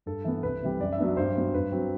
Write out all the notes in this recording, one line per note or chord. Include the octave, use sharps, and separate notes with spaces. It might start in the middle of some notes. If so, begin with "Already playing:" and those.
G2 A4
E3 B3
C2 B4
C3 E3 G3
F#2 D5
E5
F#3 B3 D4
G2 C5
F#3 B3
G2 B4
F#3 C4